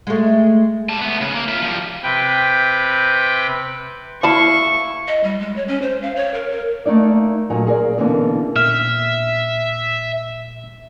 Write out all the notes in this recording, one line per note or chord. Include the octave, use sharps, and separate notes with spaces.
G#3 A3
G3 A5
A3 B3
C#3
A#3
F4 E5
F3 G3
C3 B4 G5
E4 D5 F5 A5 B5 C#6
D#5
G3
G#3
C#5
C#4
C5
F5
C#5
A#4
A#4
A3 A#3 D#4 D5
A#2 F#3 A3 D#4 G#5
G#4 A#4 D5
B2 D3 E3 A#3 B3 C#4
A#2 E5 F6